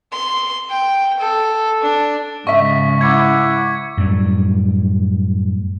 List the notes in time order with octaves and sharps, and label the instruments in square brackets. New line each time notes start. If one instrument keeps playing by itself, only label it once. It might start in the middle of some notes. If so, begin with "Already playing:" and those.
[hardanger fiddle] C6
G5
A4
D4
[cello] G#2 C#3 [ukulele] D#5 E5 [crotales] C#6 B6
[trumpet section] E4 F#5 D6 [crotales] G#6 C#7
[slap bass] F#2 A2 G3